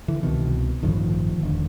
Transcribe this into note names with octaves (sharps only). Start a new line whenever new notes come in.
D3 E3
C2 B2 D#3
A1 G2 D3 D#3 F3
E1 D3